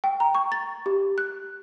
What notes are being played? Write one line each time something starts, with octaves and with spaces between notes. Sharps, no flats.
G5
A#5
C#6
A6
G4
F#6